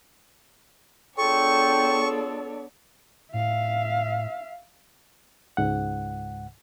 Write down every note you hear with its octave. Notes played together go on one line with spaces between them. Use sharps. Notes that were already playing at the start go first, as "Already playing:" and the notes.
B3 D4 F4 G#4 A4 C#5 G5 C#6
A2 E5 F5
C#2 G#2 F#5